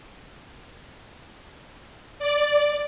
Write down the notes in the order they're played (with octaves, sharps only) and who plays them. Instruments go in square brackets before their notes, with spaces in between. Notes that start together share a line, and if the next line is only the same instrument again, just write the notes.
[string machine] D5